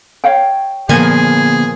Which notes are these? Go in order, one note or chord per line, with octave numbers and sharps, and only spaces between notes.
C#5 F5 G5
A#2 D3 F3 A#3 B3 G#4 G#5